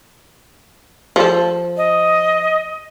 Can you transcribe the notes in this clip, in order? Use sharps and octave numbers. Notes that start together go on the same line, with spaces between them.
F3 A4
D#5